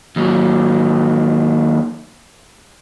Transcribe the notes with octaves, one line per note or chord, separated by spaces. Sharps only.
D#2 F#3